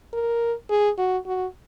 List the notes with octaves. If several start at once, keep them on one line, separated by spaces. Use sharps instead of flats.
A#4
G#4
F#4
F#4